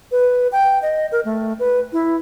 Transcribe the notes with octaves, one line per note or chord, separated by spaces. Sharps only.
B4
G5
D#5
A#4
A3
B4
E4